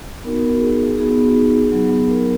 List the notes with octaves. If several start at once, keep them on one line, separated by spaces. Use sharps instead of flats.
B3 D#4 F#4 A#4
G#4
B3 D#4 F#4 G#4
G#4
F#3 B3 D#4 G#4
A#4